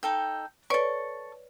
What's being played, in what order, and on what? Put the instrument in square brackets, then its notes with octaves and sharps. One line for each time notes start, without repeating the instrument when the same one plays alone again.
[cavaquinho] D#4 A4 G5
[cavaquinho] A4 C#6 [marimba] B4 C#5 D5